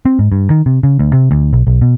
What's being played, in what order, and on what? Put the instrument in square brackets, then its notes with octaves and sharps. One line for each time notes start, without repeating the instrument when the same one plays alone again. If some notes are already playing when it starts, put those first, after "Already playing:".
[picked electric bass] C4
G#2
G2
D#3
C3
C#3
D2
C3
D2
B1
B1
B2